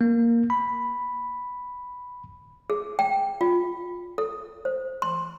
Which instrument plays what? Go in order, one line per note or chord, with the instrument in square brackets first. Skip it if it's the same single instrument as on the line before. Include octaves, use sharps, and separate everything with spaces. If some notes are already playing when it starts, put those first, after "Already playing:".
[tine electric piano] A#3
B5
[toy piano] G#4
G5
F4
A4
C5
C6